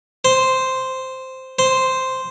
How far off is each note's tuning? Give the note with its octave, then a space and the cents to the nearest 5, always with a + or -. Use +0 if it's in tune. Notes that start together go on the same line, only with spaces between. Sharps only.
C5 -5
C5 -5